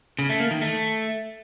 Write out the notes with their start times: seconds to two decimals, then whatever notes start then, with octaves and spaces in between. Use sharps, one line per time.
0.19 C#3
0.29 A3
0.40 A#3
0.51 D#3
0.62 A3